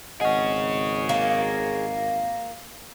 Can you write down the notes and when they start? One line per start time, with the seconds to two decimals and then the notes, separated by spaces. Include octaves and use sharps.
0.21 G#1 G#4 C#5 D#5 F#5
1.09 A#3